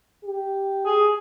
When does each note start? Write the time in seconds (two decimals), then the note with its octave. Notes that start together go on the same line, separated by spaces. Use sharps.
0.25 G4
0.86 G#4